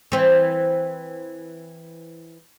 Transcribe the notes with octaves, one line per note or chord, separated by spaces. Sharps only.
E3 C4